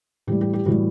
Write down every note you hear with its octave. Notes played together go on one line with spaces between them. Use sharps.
A2 E3 G3 G4
G4
G4
A2 E3 G3 F#4